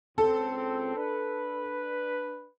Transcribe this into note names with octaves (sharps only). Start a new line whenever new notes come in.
C#2 C4 A4
D4 B4